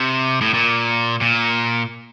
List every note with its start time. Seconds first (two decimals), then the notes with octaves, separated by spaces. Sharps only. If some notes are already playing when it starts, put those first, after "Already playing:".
Already playing: C3
0.41 A2
0.54 A#2
1.21 A#2